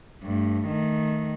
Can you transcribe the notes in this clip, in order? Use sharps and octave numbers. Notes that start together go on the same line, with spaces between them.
G2 A3
D#3 A3